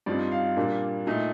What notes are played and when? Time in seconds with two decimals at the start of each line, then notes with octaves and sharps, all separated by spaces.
0.06 G2 F3 C4 D#4 D5
0.32 F5
0.57 A#2 G3 A#3 D4
1.07 A#2 A3 D#4